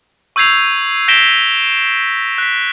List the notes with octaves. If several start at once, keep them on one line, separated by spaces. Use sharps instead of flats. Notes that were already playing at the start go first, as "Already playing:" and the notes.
C#6 E6 G6 G#6 C7 F7
G6 A#6 B6 D7 E7 G7
F#6 B6